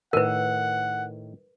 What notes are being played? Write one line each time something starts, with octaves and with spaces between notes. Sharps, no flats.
A2 D#3 A#4 B4 F#5